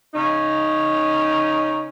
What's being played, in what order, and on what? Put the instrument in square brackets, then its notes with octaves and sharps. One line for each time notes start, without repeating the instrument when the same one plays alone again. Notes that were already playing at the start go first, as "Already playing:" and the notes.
[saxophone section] C#3 C#4 D#4